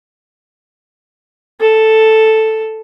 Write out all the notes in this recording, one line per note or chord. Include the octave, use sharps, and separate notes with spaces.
A4